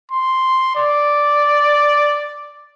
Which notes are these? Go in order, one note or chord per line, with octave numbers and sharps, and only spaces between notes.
C6
D5